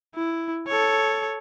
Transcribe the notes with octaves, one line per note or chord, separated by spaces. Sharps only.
E4
A4 C#5